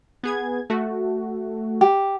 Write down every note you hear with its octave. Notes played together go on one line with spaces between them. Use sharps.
B3 G#4 G#6
A3 F#4
G4